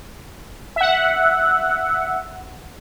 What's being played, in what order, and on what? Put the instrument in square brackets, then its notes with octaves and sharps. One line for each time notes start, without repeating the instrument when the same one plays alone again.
[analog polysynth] E5 F#5